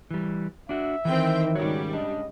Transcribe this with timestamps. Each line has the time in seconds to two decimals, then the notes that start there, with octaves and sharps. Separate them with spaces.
0.11 E3 G3
0.69 D4 F#4 E5
1.05 D#3 E3 C4 G5
1.55 G#2 C#3 G3 F#4 C#5
1.93 D4 D#5